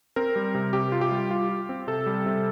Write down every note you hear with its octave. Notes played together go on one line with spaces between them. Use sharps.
C4 A#4
G3
C3
C3 G4
F4
G4
G3
F4
F4
C4
C3 A4
G3
C3